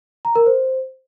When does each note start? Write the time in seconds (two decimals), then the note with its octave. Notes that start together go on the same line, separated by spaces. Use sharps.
0.25 A#5
0.35 A#4
0.46 C5